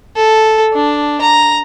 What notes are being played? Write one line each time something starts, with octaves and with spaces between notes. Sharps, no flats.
A4
D4
A#5